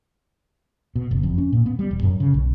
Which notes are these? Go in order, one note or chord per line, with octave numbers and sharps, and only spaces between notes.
B2
F#1
F2
C#4
A#2
B3
G3
E1
F#2
C#3
B1